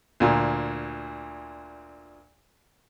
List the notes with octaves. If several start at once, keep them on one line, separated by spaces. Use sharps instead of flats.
D2 A#2